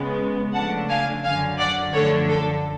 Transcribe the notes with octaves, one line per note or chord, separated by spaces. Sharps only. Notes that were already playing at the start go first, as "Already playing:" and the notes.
Already playing: C#3 G#3 B3
C#3 F3 A3 D4 F#5 A5
F5 G#5
F#2 D3 F#3 F5 G#5
D5 F#5
F#2 D3 F3 A3 D4 A4 C#5
A4